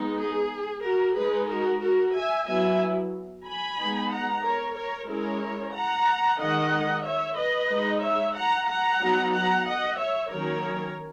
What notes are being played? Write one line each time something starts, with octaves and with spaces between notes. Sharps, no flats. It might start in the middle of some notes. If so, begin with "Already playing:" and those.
Already playing: G#3 B3 D#4
G#4
F#4 A#4
G#3 D#4 G#4 B4
F#4 A#4
F#4 A#4
E5 G#5
F#3 B3 E4 E5 G#5
G#5 B5
G#3 B3 D#4
F#5 A#5
A#4 C#5
A#4 C#5
G#3 C#4 E4 A#4 C#5
F#5 A#5
D#3 G#3 D#4 D#5 F#5
C#5 E5
B4 D#5
G#3 D#4
C#5 E5
F#5 A#5
F#5 A#5
F#3 B3 D#4
F#5 A#5
D#5 F#5
C#5 E5
D#3 F#3 A#3 C#4 A#4 C#5